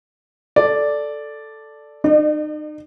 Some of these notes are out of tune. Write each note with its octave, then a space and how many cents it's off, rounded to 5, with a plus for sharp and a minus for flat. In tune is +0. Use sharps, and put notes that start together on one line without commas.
A4 +0 D5 +0
D#4 -35 D5 +45